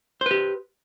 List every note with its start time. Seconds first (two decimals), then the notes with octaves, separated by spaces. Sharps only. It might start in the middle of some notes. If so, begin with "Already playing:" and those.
0.21 C5
0.26 B4
0.31 G4